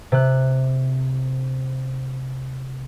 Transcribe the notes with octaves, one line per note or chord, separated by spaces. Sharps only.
C3 F#6